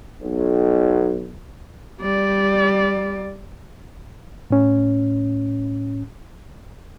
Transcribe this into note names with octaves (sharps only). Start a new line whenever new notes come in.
B1
G3 D5
A2 C#4